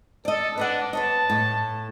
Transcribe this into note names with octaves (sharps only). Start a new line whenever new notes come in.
A4 D5 D#5
D4 B4 D#5 F#5
B4 C#5 D#5 A5
A2